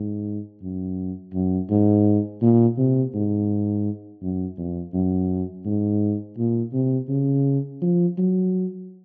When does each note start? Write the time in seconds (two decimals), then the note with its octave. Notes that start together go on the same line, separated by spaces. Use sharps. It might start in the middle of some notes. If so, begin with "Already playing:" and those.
Already playing: G#2
0.62 F#2
1.34 F#2
1.70 G#2
2.42 A#2
2.78 C3
3.14 G#2
4.22 F#2
4.58 F2
4.94 F#2
5.65 G#2
6.37 A#2
6.73 C3
7.09 C#3
7.82 F3
8.18 F#3